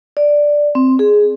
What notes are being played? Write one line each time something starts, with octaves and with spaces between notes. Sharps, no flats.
D5
C4
G#4